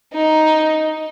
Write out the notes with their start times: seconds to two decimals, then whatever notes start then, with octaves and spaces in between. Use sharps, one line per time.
0.14 D#4